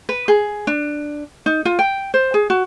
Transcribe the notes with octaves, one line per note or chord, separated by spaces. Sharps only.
B4
G#4
D4
D#4
F4
G5
C5
G#4
F#4